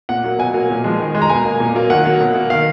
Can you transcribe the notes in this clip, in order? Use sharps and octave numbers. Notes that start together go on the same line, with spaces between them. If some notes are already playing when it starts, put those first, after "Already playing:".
A#2 F#5
F#3 A#3
B2 G#5
F#3 A#3
A#2
F3 G#3
D#3
G#3
A#5
B2 G#5
A#3
A#2
F#3 A#3
D#3 F#5
F#3 A#3
B2
A#3
D#3 F5